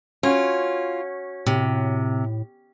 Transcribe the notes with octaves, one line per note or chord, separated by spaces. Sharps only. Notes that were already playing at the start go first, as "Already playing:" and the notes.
C#4 F4 F#4 C#5 F#5
A2 C3